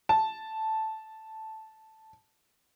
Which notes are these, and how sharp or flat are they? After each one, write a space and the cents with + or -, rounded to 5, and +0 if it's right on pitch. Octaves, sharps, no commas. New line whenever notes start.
A5 -5